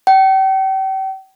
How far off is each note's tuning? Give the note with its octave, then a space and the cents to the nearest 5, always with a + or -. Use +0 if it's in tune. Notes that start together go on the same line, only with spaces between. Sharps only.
G5 -35